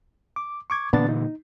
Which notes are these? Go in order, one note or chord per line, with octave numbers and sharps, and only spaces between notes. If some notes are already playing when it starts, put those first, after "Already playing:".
D6
C#6 D6 G#6
A#2 D3 E3 B3 D4 A6
D#4